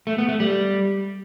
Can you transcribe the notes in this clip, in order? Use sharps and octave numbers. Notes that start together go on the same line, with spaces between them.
A3
B3
A3
G3